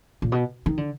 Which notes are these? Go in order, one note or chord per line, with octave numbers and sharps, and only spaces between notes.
A#2
B2
D#3
D3